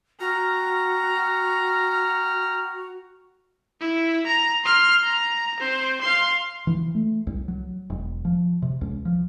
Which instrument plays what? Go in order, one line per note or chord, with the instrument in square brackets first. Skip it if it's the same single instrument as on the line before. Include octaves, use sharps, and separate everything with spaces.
[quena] F#4 [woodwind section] G5 F6 [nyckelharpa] A#5
[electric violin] E4
A#5
C6 F6
A#5
C4 C5
F5 C6
[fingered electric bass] E3
A3
C2
F#3
E1
F3
C3
C#2
F3